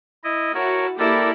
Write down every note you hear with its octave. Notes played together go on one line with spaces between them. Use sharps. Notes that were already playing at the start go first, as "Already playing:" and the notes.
E4 D#5
E4 F#4 A#4 C#5 A5
A#3 E4 G4 A4 A#4 D5